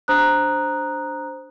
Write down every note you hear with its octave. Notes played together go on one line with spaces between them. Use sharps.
D4 C5 A#5 D#6 F#6